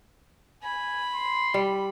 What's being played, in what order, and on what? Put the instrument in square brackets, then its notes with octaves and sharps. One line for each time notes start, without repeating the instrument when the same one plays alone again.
[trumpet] G#5 [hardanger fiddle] B5
[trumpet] C6
[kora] G3